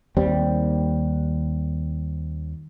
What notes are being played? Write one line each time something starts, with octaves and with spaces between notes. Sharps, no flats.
D#2 G3 C4